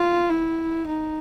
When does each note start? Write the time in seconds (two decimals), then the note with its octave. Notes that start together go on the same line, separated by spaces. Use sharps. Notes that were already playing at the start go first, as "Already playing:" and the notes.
Already playing: F4
0.30 E4
0.87 D#4